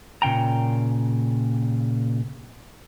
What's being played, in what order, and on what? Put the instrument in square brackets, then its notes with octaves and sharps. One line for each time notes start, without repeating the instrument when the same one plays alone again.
[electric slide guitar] A#2 C#3 G5 A#5